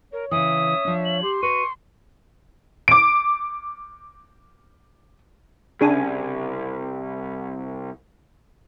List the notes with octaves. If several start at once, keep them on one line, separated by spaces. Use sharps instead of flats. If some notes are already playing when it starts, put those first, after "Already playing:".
A#4 C#5
C#3 E3 E5 D#6
F3 D4
F#7
G4 C6
F#4 B4 D#5 C#6 D#7
D6 D7
C2 C#3 D4 G#5